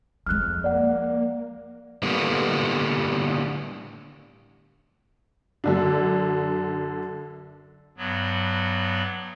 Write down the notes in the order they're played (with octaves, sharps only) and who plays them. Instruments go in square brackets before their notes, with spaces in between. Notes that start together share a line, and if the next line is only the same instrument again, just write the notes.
[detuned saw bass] F2 [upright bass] F3 G#3 [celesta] F6 F#6
[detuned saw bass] A#3 [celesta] D5 F#5
[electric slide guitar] A2 D3 G3 A#3 B3
[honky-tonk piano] F#2 D3 D4
[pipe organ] G2 F#3 B3